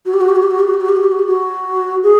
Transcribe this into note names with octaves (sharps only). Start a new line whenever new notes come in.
F#4
G4
F#4
G4
F#4
G4
F#4
G4
F#4
G4
F#4
G4
F#4
G4
F#4
G4
F#4
G#4